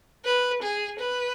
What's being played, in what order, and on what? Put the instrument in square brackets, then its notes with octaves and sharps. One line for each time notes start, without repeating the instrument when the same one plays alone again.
[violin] B4
G#4
B4